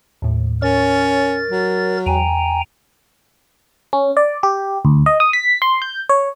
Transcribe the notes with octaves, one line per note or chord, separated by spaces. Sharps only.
D#2 A2
C#4 A#4 C#5 A6
F#3
E2 G5 G#5 A#5
C#4
D5
G4
D2
D#5
D#6
B6
C6
G6
C#5